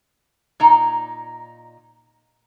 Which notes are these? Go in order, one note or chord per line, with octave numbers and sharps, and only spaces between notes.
A#2 D#4 A#5